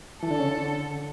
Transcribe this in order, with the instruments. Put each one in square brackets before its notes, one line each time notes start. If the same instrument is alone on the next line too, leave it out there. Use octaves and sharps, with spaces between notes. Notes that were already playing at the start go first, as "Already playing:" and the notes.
[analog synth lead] E3 [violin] A4
[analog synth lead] D3
C#3
D3